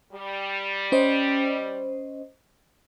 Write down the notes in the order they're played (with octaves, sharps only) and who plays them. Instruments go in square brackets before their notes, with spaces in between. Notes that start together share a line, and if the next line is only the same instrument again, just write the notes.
[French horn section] G3
[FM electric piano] C#4 C5 D#5